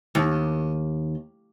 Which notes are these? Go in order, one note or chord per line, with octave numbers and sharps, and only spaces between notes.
D#2